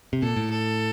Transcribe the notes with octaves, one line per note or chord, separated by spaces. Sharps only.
C3
A#2 A4
A2
A4